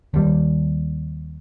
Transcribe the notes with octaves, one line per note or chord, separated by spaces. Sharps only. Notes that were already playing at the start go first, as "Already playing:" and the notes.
D#2 G3